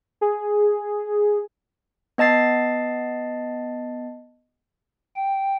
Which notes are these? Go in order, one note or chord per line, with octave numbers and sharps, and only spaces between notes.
G#4
B3 D#5 A5 A6 C7
G5